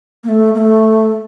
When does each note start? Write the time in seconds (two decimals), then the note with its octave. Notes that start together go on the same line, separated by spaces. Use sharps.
0.24 A#3
0.28 A3
0.54 A#3
0.58 A3